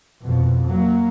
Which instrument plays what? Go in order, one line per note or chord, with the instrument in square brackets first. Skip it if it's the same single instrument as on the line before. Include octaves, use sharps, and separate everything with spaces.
[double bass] F2 B2
F#3 A#3